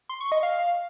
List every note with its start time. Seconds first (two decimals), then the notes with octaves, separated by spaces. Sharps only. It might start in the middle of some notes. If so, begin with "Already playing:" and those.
0.09 C6
0.21 C#6
0.32 D#5
0.43 F5